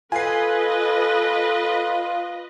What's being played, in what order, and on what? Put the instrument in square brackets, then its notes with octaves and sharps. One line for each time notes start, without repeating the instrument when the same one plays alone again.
[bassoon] F4 [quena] A4 [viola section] B4 D#5 [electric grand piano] G#5 C7